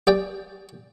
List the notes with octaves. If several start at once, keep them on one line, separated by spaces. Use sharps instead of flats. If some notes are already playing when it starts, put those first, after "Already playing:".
G4 D5 G5